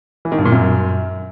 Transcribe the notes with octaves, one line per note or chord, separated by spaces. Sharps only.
E3
D#3
G2
A#2
F#2